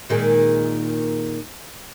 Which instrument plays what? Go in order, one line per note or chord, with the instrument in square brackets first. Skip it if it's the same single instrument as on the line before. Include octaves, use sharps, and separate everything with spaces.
[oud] A#2 D#3 G#3